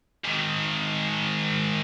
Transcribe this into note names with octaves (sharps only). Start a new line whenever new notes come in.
G#2 D#3